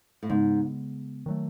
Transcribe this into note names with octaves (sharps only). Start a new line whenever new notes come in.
A2
G#2 C#3 G#3 B3
D#3 F#3 A3